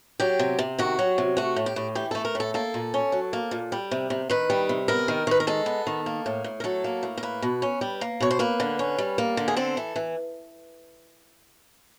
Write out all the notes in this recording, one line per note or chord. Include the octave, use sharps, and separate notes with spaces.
F#3 G4
C3
C3
D#3 F#4
F#3
C3
A3 F#4
A2
G4
A2
E3 G4
A3 A4
A#4
A2
A4
A#3 A4
A#2
C#4
F#3
A#3
A#2
G3
C3
C3
D#3 B4
G3
C3
B3 A#4
D#3
D#3 B4
A#4
G#3 A4
B3
D#3
A#3
A2
A2
A#4
F#3 A4
A#3
A2
A#4
A#3 B4
B2
C#4
G3
A#3
B2 C#5
C5
A#3 B4
D3
C#4
G3
A#3
D3
G#4
C4 A4
E3
E3